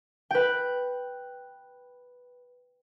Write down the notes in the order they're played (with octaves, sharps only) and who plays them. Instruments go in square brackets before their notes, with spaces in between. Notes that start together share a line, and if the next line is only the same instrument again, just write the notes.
[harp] B4 G5